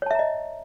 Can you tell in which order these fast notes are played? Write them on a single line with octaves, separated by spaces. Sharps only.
C#5 A5 E5 A#5 D#5